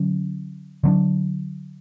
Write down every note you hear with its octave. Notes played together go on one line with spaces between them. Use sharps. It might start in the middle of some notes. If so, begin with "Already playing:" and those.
Already playing: D3 F#3 C#4
D3 F#3 A3 D4